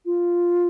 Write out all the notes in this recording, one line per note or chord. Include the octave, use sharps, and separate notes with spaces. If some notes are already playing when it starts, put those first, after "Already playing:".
F4